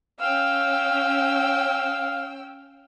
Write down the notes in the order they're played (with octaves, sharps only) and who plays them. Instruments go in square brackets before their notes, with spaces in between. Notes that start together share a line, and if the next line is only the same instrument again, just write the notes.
[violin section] C#4 G5 E6 [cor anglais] F5